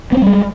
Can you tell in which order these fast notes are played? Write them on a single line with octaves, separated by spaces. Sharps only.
B3 C4 G3 G#3